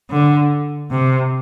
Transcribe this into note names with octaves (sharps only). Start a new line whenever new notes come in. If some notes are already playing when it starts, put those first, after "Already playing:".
D3
C3